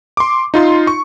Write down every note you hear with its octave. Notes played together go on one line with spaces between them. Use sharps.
C6 D6
D#4 F4 C6
C#6